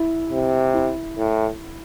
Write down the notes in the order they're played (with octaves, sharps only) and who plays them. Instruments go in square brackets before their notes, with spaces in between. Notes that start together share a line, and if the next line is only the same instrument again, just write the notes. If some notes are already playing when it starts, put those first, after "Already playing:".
Already playing: [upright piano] E4
[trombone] C3
[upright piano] E4
[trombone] A2